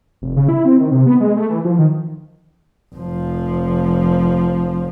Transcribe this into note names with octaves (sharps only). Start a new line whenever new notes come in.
F1
C#3
E4
C4
D#3
C3
B3
G#3
A3
E3
F3
D#3
F1 F3